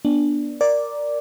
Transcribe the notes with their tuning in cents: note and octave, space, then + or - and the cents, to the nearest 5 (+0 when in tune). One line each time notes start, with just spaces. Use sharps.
B3 -30 D4 +0
A#4 +0 D5 +0